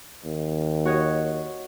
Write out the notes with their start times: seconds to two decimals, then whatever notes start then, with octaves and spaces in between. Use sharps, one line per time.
0.25 D#2
0.85 F#4 C#5 D#5